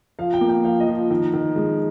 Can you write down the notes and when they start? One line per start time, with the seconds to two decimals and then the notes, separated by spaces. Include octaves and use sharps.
0.19 F3 F5
0.33 G5
0.41 A#3
0.49 G5
0.64 F3 F5
0.80 D#5
0.87 F3
1.11 D#3
1.33 D#3
1.56 G#3